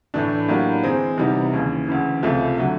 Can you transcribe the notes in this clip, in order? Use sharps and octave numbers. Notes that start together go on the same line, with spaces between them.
A2 E3 A3 D4
A2 F#3 A#3 D4 G4
E3 G#3 C4
C3 E3 G3 B3 D#4
D#2 C#3 E3
D2 C#3 E3
C#2 C3 F3 A3
D3 F#3 A3